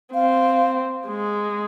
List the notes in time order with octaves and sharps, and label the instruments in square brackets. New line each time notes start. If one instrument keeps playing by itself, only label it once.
[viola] C4 [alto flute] F5
[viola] G#3